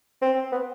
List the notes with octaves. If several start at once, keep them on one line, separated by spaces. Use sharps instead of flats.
C4
B3